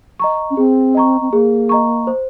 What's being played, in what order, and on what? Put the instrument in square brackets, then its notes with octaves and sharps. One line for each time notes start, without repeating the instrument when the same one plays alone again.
[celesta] D#5 A#5 C#6
[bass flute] C#4
[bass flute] C4 [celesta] G#4
[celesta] D#5 A#5 C#6
[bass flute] C4
[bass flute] A#3 [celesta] G#4
[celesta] D#5 A#5 C#6
C5